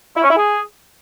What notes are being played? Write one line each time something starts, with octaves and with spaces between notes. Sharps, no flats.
E4
C#4
E4
G#4